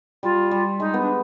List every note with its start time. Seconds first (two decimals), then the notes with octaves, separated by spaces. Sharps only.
0.23 G3 F4
0.51 G3
0.80 G#3 D#4
0.94 B3
1.01 D4